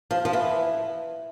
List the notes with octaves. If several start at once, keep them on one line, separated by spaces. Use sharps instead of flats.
F3
F3
E3